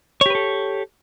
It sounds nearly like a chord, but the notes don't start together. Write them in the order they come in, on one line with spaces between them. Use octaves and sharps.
C#5 G4 B4 A4